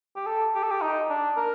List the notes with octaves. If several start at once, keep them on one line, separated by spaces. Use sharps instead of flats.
G4
A4
G4
A4
G4
D#4
D4
A#4